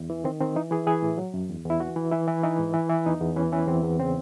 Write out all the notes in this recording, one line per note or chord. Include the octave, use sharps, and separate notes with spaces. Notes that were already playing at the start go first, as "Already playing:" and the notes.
Already playing: E2
E3
D#3 C4
D#3 C4
E3 D#4
E3 G#4
E3 G#4
A2
F#3
F#2
E2
E2
E4
E3 F#4
E3
E3 E4
E3
E3 D#4
G#2
E3
E3
E2 D#4
E2
E3 C#4
E3 C#4
E2 C4
E2
C#3 C4